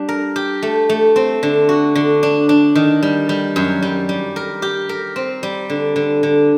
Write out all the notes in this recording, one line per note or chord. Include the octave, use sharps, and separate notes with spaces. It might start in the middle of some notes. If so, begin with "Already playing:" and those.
Already playing: G3 D4
A#4
G4
A3
A3
C4
D3
F#4
D3
D4
D4
D#3
G3
G3
F#2
G3
G3
A#4
G4
A#4
C4
G3
D3
D3
D3